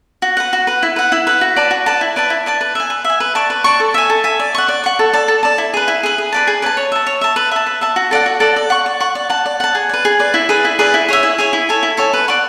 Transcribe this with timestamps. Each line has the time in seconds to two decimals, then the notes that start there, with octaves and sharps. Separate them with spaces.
0.22 F#4
0.37 B4 F#5
0.53 F#4
0.67 B4 F#5
0.83 E4
0.96 B4 F#5
1.12 E4
1.27 B4 F#5
1.41 F#4
1.56 B4 D5 A5
1.71 F#4
1.86 B4 D5 A5
2.01 E4
2.16 B4 D5 A5
2.30 E4
2.46 B4 D5 A5
2.61 B4
2.75 E5 G#5
2.90 B4
3.05 E5
3.10 G#5
3.20 B4
3.35 D5 A5 C#6
3.50 B4
3.64 D5 A5 C#6
3.80 A4
3.94 E5 G#5
4.10 A4
4.24 E5 G#5
4.39 D5
4.55 F#5 C#6
4.68 D5
4.84 F#5 C#6
4.99 A4
5.13 D5 A5
5.28 A4
5.43 D5 A5
5.58 E4
5.74 G#4 B4
5.88 E4
6.03 G#4 B4
6.18 G#4
6.32 B4 D5 A5
6.47 G#4
6.62 B4 D5
6.66 A5
6.77 C#5
6.92 E5 A5
7.07 C#5
7.21 E5 A5
7.36 B4
7.51 E5 A5
7.66 B4
7.81 E5 A5
7.96 F#4
8.11 A4 D5 F#5
8.26 F#4
8.40 A4 D5 F#5
8.56 D5
8.70 F#5 C#6
8.86 D5
9.00 F#5 C#6
9.15 D5
9.30 F#5 A5
9.46 D5
9.60 F#5 A5
9.75 G#4
9.89 B4 D5
10.05 G#4
10.19 B4 D5
10.34 E4
10.49 G#4 B4 D5
10.65 E4
10.79 G#4 B4 D5
10.94 E4
11.08 G#4 C#5 E5
11.23 E4
11.38 G#4 C#5 E5
11.53 E4
11.69 A4 C#5 G#5
11.83 E4
11.97 A4 C#5 G#5
12.13 B4
12.28 D5 F#5 C#6